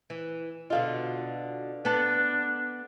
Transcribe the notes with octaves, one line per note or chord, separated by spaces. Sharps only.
E3
B2 D3 F4 D#5 F5
B3 D4 A4